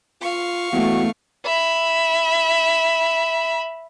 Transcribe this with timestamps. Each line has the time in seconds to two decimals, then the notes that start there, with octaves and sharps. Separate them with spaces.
0.22 F4 F5 C#6
0.72 E2 A3 F#4
1.45 E5 B5